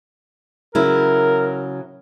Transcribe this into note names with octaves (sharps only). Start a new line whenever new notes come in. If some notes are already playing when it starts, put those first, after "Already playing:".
C#3 F#3 E4 A#4